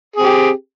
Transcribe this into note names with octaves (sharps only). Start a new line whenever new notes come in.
C4 G4 G#4